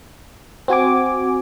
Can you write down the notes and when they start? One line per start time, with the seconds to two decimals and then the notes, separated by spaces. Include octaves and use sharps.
0.68 C4 F#4 G#5 D6